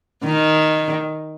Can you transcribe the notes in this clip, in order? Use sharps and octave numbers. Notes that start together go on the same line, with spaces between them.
D#3